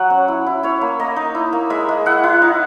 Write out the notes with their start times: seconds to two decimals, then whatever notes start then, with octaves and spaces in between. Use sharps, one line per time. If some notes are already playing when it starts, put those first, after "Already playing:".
Already playing: F#3 F#5
0.10 C#4
0.28 E4
0.46 E4
0.63 E4 C#5
0.81 A#3
0.99 A#3 D#5
1.16 D#4
1.35 E4
1.53 A#3
1.70 G#3 E5
1.89 G#3
2.06 E4 F#5
2.24 E4
2.42 D#4